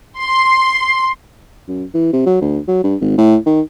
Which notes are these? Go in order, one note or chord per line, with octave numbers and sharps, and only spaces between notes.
C6
F#2
E3
C3
F#3
D2
F#3
G2
G#1
A2
D#3